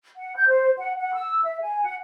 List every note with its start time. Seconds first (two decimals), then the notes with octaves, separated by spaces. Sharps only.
0.16 F#5
0.35 G6
0.48 C5
0.77 F#5
0.99 F#5
1.14 E6
1.43 E5
1.62 G#5
1.84 F#5